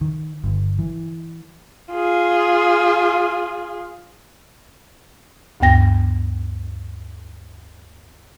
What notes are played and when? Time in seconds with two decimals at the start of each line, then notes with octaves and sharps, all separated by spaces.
0.01 D#3
0.44 G1
0.79 E3
1.92 F4 G#4
5.60 D2 G2 B3 G5 A#6